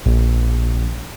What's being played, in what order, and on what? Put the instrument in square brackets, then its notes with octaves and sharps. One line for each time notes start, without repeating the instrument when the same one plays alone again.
[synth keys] A#1